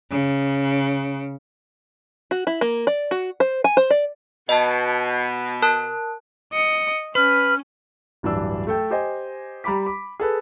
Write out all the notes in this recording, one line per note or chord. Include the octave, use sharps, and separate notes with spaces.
C#3
F#4
E4
A#3
D5
F#4
C5
G#5
C5
D5
B2 D#5 A5
A#4 A5 F#6
D#5 C#7
C#4 B4 F6
D1 G2 E3 D4 E6
A3 A4 G5
G4 C5 D#5 G#5
G3 A#5 B5 D6 B6
B5 D6
G#4 A4 B4